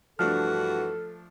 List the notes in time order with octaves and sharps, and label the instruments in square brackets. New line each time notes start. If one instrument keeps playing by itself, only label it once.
[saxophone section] G2 E3 F#4 [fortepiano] F3 A3 D4 [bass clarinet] A4 [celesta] F6